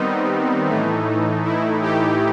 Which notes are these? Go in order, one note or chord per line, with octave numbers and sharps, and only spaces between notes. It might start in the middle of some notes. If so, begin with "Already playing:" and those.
Already playing: D#3 G3 B3 C4 D#4
A2 E3 A3
E4
G4